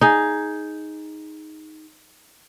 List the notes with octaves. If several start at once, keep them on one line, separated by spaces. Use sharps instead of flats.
D#4 G#4